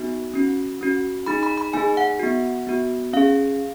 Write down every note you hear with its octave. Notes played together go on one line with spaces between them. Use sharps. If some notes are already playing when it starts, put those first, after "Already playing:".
Already playing: B3 D#4 F#4
C#4 F#4
C#4 F#4
A#3 D#4 G#4 B5
B5
B5
A#3 D#4 G#4 G#5
F#5
B3 F#4
B3 F#4
C#4 G#4 F5